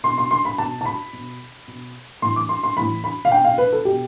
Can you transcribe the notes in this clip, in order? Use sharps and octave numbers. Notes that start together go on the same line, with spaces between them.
B2 C6
C6
C6
B5
B2 A5
A5
B5
B2
B2
A2 E3 C6
D6
C6
C6
A2 E3 B5
B5
F5
B2 G5
F5
B4
A4
B2 G4